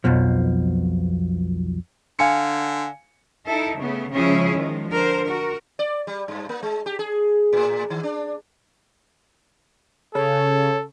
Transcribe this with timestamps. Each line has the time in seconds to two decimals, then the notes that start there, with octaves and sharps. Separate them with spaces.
0.04 B1 F2 B2 F3
2.19 D3 F5 G#5 C#7
3.47 D#4 E4 A4
3.78 C#3 A3 B3
4.11 C#3 F3 G#3 C#4 E4 G#4
4.53 D#3 F3 G#3
4.90 D3 A#4 C5
5.26 F#4 A#4
5.79 D5
6.07 G3
6.28 G2
6.49 A#3
6.63 G#3
6.86 G4
6.99 G#4
7.53 A2
7.90 D#3
8.03 D4
10.15 C#3 A4 C#5